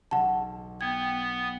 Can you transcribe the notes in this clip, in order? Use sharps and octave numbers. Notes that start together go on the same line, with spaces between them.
B1 F#5 A5
B3 G5 G#6